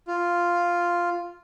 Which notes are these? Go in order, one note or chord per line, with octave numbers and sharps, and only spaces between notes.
F4